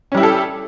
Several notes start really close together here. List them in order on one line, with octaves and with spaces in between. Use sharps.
C#4 G3 E4 G4 A4